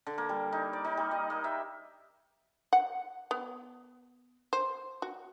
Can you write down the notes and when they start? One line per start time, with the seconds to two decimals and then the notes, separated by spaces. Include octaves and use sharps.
0.07 D3
0.18 A#3
0.29 G3
0.52 D#4
0.73 D5
0.84 D#4
0.97 G3
1.11 D#5
1.30 A#3
1.44 E5
2.73 F#5
3.31 B3
4.53 C5
5.02 F#4